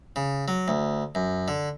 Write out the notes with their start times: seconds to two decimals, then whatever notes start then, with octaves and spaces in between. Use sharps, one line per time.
0.16 C#3
0.48 F#3
0.68 D2
1.15 F#2
1.48 D3